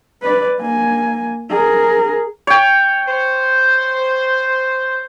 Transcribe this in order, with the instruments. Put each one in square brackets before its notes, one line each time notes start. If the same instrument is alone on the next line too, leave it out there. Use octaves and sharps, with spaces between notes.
[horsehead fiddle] B4 D5
A#3 G#5
G#4 A#4
[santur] C#5 G5
[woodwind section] C5